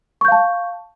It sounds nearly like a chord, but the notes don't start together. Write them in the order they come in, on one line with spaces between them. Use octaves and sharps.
C#6 G6 F5 A5